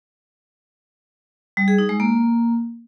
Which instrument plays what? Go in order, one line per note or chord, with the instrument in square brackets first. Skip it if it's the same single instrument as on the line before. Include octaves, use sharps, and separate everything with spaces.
[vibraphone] G3
G#4
D#4
G#3
A#3